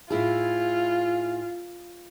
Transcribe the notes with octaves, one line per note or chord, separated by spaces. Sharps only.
A2 E4 F4 G#4